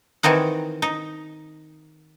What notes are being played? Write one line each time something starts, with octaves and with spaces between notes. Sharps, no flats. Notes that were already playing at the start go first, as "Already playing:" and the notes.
D#3 E3 C4 D#4 F#5
D#4